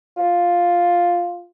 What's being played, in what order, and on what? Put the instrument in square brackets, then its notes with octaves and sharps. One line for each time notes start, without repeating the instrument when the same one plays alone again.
[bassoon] F4